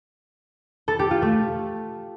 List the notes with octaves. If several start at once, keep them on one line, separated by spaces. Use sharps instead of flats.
A4
G4
F4
A3